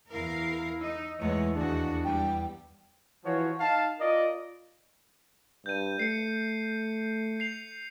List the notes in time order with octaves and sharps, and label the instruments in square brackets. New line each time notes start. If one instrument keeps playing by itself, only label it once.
[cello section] E2 A#4 F5 [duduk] E4
[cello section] D#4 [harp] E6
[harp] E2 D#7 [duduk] E3 [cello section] G#3 A3 C#5
[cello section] D#2 F#4 [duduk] D4 [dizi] G#4
[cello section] G3 [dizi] G5
[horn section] E3 F3 F#4 C#5
D#4 F5 A5
F4 A#4 D5 D#5
[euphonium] G2 [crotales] G6 D#7
[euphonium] A3 [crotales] C7 C#7
[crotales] C7 F7